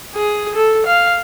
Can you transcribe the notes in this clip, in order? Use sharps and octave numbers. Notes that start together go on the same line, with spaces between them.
G#4
A4
F5